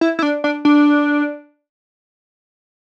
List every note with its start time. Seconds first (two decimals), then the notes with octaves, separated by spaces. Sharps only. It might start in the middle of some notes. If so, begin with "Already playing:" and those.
0.01 E4
0.19 E4
0.23 D4
0.44 D4
0.65 D4